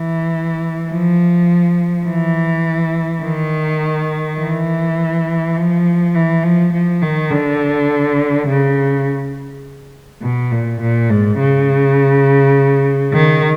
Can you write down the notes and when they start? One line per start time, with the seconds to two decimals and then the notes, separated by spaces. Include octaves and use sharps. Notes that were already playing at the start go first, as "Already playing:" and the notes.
Already playing: E3
0.91 F3
2.07 E3
3.23 D#3
4.39 E3
5.57 F3
6.15 E3
6.44 F3
6.73 F3
7.02 D#3
7.31 D3
8.48 C#3
10.22 B2
10.52 A#2
10.81 A#2
11.10 G#2
11.39 C#3
13.14 D#3